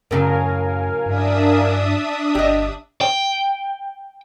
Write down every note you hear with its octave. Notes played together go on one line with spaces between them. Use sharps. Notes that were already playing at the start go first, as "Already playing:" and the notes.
F#2 A2 C#3 F#3 A#4 F5 G#5
G2 D4 E5 D#6
G1 G4 D#5
G5